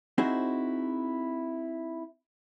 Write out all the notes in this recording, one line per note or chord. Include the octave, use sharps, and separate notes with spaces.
C4 D#4 E4 F#4 G#4 C5